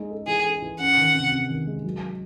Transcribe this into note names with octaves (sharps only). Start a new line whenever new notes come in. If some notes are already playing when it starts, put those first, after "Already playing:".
Already playing: G#3 D#4
A4
E3 G#4
A4
E3
C#4 F#5
D#3
C3
C3
D#3
G#3
F#3